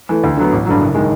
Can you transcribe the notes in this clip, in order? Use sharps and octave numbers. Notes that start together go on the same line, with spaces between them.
E3 A3
D2
D3 F#3 B3
A1
G2 D3 F#3
F#1
D#3 G#3